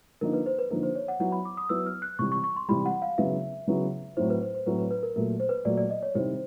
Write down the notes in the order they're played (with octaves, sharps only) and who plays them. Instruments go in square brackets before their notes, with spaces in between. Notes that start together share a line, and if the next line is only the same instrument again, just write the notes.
[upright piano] D3 F3 A#3 D#4 [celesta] A#4
[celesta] B4
C5
B4
[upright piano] D3 F3 A#3 D#4 [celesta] A#4
[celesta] C5
C#5
F#5
[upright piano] F#3 B3 E4 [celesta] F#5
[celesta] B5
D6
D#6
[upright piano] F#3 B3 E4 [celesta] E6
[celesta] F6
F#6
[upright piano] C3 E3 G3 [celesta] C#6
[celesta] C#6
C#6
C6
[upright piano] C3 E3 G3 [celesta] B5
[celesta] F#5
F5
[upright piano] C#3 F#3 B3 E4 [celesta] E5
[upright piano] C#3 F#3 B3 E4
[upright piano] A2 F#3 A3 C4 E4 [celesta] C5
[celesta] B4
C5
C5
[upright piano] A2 F#3 A3 C4 E4 [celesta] B4
[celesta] B4
B4
A#4
[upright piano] A#2 F#3 A3 [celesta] A#4
[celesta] C5
B4
[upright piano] A#2 F#3 A3 [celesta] D5
[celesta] D5
D#5
C#5
[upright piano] C3 D#3 G3 C4 E4 [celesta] C5